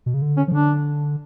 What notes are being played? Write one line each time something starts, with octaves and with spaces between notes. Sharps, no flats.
B2
C#3
D3
C#4
F3
D3 D4